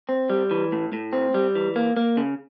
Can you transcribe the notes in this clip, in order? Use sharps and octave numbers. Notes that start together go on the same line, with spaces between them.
C4
G3
E3
A2
A2
C4
G3
E3
A#3
A#3
C#3